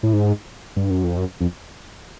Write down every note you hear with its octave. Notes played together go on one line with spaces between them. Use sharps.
A2
G#2
G2
F#2
F2
F#2
F2